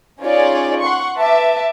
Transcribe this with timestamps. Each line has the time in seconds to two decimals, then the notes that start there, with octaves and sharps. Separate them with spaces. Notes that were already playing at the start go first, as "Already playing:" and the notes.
0.21 C#4 D#4 F4 G#4 C#5 D5
0.81 F#5 C6 C#6
1.17 B4 E5 A5 D6